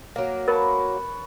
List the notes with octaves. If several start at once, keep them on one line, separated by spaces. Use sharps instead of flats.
F#3 A#3
A#4 B4 C#5 A5